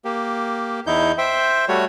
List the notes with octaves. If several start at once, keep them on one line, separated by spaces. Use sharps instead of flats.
A#3 G4
E2 D#4 E4 G6
C5 E5 G5
G3 A3 F#4 C#5